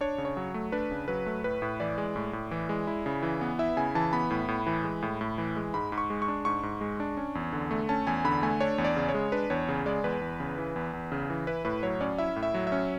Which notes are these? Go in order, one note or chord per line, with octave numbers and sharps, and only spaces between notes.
D4 C#5
C#3
C#5
F#3
A3
D4 B4
C#3
F#3 B4
A3
A2 B4
A2
E3 D5
G#3
A2
A2
E3
G#3
E4
C#3
E3
B3
E4 E5
C#3 G#5
E3 A5
B3 B5
A2
A2
E3
G#3
A2
A2
E3
G#3
G#2 B5
G#2
C#6
G#3
C#6
D4
G#2 C#6
G#2
G#3
D4
C#4
E2
D3
A3
C#4 A5
E2 G#5
D3 B5
A3 G#5
D4 C#5
E2
D5
C#3
C#5
G#3
D4 B4
E2 C#5
C#3
G#3 D5
E2 B4
E2
C#3
E3
E2
E2
C#3
E3
E4 B4
A2 B4
F#3 C#5
C#4 D5
E4 E5
A2
E5
F#3
E5
C#4